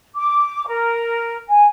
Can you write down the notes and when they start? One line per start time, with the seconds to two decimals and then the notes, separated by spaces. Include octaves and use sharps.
0.15 D6
0.67 A#4
1.49 G#5